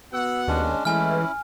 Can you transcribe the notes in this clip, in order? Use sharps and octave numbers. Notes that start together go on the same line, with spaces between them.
B3 F#4 F#5 E6
D#2 G#3 C#4 D4
E3 G#3 A3 C#4 E4 G#5 F6